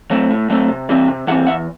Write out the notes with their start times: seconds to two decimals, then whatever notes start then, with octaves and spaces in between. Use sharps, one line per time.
0.11 F#3 A3 C4
0.30 A2
0.50 F#3 A3 C4
0.69 C3
0.89 E3 G3 C4
1.08 C3
1.27 E3 G3 C4 E5 F#5
1.47 E2 E5 F#5